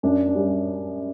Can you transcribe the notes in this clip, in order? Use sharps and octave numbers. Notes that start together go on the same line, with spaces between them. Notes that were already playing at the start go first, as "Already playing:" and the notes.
F#2 D4
D4
G3 C#4